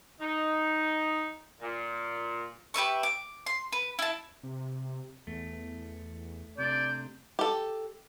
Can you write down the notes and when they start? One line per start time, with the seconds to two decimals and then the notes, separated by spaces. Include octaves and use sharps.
0.21 D#4
1.61 A#2
2.74 G4 B4 E5 C#6
3.03 D6
3.46 C6
3.72 B4
3.99 E4 A5
4.43 C3
5.27 E2 A3
6.58 C3 A3 D4 D5 G6
7.39 G4 A4